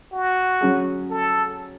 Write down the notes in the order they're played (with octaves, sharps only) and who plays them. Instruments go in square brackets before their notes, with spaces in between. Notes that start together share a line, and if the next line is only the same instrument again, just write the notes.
[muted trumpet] F#4
[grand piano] F#3 C#4 G#4
[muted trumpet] A4